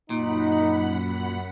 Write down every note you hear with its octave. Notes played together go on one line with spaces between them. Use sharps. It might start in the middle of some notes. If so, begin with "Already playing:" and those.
F#2 A#2 D#4 F#5 B5